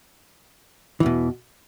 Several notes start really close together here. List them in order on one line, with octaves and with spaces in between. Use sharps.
E3 E2 B2